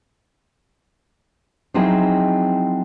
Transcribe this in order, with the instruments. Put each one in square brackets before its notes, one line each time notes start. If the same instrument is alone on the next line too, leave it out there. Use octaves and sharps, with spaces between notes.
[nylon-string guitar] F3 F#3 C4 D#4 E4 G#4